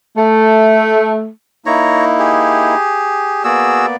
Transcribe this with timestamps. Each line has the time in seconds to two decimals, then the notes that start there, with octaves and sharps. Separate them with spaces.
0.16 A3
1.66 A#3 D#4 E4 C#5 A#5
2.19 G4 G#4
3.44 A#3 B3 F#4 G#4 D5 E6